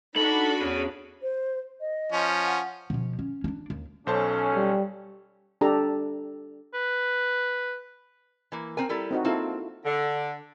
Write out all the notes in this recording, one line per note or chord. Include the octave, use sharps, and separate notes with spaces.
D4 D#4 F#4 A4 B5 F#7
E2 C#4 G#4
C5
D#5
F3 C#4
F#5
B2 F3
C#4
C#4 D4
D#2
B1 C#4 A4 C5 A5
G3
D4 G4 A4 A#5
B4
E3 A#3
C4 A#4 G#5
G3 E4 A4
C4 D#4 F#4
A#3 C4 E4 F4 A4
D3